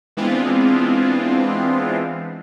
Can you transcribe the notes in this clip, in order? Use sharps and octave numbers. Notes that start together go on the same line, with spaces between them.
E3 G#3 B3 C4 D4 F4